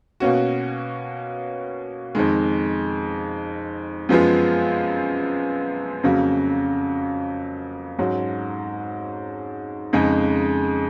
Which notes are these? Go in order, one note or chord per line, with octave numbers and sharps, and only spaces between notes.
B2 A#3 C#4 F#4
F2 D#3 G#3
F#2 F3 G#3 B3 F4
F2 C#3 F#3 A#3
G#2 F#3 C#4
F2 C#3 G#3 D#4 G#4